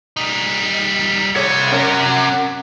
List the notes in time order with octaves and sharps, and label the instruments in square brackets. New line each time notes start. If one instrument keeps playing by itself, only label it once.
[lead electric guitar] G3 D#4
[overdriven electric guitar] C2 C#5 [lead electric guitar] C3
[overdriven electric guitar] C#4 A#4